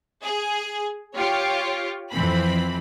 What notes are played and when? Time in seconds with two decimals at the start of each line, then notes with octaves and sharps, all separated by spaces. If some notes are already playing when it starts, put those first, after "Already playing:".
0.24 G#4
1.17 F4 G4 C#5
2.12 F2 E3 C4 B5